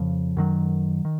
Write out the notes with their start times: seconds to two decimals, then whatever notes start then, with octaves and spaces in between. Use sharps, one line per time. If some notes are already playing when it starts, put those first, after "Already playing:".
Already playing: F2 C#3 F3
0.37 F#2 D#3 F#3
1.05 D#3